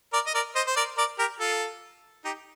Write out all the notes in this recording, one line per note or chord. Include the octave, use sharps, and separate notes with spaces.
A#4 D5
D#5
A#4 D5
C5 D#5
C5
A#4 D5
A#4 D5
G4 A#4
F4 A4
D#4 G4